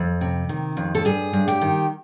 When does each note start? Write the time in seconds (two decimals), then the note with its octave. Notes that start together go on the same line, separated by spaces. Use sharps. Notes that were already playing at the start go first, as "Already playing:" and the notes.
Already playing: F2
0.21 C3
0.49 D#3
0.77 F2
0.95 A4
1.05 G2 G#4
1.33 G2
1.48 G4
1.61 D#3